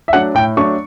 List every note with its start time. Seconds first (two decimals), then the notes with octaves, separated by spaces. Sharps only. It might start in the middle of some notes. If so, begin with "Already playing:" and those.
0.08 E5
0.13 F#3 A3 D4 F#5
0.34 A2 G5
0.57 F#3 A3 D4 C#6